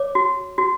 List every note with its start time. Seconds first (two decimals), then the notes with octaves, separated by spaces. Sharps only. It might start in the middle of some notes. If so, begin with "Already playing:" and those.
Already playing: C#5 D6
0.15 F#4
0.58 F#4